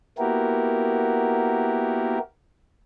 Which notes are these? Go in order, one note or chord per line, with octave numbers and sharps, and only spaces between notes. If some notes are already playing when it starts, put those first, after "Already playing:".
A#3 B3 E4 F#4 G4 A#4